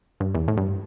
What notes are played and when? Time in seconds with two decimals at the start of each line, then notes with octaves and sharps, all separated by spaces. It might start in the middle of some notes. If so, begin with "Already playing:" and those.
0.20 G2
0.34 E2
0.48 A2
0.57 G2